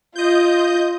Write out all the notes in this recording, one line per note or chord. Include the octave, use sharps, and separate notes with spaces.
F4 D#5 G6